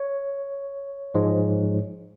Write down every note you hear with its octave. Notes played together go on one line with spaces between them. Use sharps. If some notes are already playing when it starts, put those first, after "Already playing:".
Already playing: C#5
G#2 F3 G#3